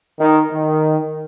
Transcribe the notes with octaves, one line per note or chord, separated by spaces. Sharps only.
D#3
D#3